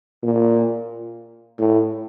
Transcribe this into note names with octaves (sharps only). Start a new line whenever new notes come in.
A#2
A2